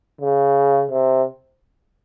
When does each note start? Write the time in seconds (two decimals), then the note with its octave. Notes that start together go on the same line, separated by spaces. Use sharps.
0.21 C#3
0.91 C3